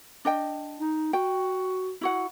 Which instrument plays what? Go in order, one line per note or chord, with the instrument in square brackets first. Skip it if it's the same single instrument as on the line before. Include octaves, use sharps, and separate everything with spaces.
[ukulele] D4 D#5 G5
[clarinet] D#4
[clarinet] F#4 [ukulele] G5
[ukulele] E4 F#4 F#5